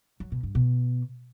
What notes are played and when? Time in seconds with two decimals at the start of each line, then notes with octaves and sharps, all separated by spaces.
0.20 F#3
0.32 B2
0.43 G2
0.55 B2